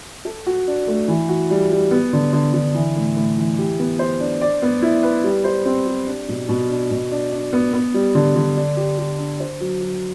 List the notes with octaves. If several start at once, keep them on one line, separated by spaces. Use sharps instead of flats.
A4
F#4
D4
A3
E3
F#4
G3
G3
B3
D3
D3
D3
E3
A2
A2
E3
G4
B3
C5
D4
D5
B3
E4
B4
G3
C5
C4
G4
D4
B2
B2
D4
B2
D4
D4
B3
B3
G3
D3
D3
D4
G4
G4
D4
C5
F#3
F#3